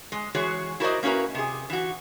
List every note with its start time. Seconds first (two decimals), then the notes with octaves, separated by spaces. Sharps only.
0.12 G#3
0.34 E3 G#3 F#4 G#4 C#5
0.80 E4 F#4 A#4 C5 D5 D#5
1.03 A#3 C#4 E4 F#4 A#4 B4
1.35 C3 G#4
1.70 E3 F#4